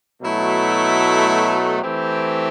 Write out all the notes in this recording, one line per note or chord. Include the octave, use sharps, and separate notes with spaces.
B2 F#3 A3 E4
E3 A3 C4 E4 G4